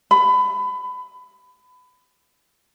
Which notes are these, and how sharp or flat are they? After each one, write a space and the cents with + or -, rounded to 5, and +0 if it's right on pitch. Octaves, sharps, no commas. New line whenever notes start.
B5 +25